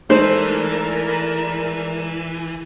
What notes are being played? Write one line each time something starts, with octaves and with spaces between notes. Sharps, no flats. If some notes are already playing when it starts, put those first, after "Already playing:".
E3 G#3 A3 D#4 A#4 C5 D5